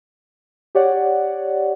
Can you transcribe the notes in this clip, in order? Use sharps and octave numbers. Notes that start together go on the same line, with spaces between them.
G4 C#5 D5 F#5